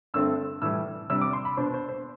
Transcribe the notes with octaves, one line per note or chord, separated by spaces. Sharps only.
G2 D3 A3 C4 E6
A2 E3 G3 E6
C3 G3 D4 E6
D6
C6
B5
B2 B3 D4 C5
C5
C5